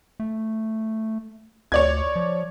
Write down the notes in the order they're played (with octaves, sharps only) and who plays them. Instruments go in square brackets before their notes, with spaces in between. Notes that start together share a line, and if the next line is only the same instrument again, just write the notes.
[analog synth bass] A3
[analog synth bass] D2 [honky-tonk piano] C#5 D5 G#6
[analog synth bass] F3